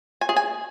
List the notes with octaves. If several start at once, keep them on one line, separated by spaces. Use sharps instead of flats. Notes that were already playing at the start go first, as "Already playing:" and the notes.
G#5
G#4
G#5